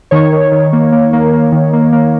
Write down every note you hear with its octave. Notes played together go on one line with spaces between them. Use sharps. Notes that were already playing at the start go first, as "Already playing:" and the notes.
D#3 C#5
D#3
D#3
A#3
A#3
A#3
A#3
D#3
A#3
A#3